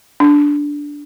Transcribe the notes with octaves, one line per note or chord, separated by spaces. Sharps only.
D4